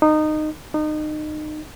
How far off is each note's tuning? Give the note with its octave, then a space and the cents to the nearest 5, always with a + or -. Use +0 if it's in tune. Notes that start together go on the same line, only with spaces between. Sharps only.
D#4 -20
D#4 -30